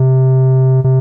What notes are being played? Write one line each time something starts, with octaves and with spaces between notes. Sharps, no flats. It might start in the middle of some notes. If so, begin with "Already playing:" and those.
Already playing: C3
C3